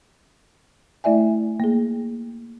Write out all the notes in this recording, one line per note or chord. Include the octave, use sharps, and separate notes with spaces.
A3 E4 D5 E5 G#5
A#3 G#4